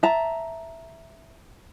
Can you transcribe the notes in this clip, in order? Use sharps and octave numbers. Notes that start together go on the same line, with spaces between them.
E5 A5 A#5